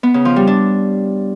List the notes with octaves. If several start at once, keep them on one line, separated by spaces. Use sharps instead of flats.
B3
C#3
F3
G3
D4